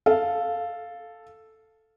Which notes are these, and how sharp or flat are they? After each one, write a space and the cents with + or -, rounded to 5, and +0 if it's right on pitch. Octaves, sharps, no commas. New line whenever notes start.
A4 +0 F5 +0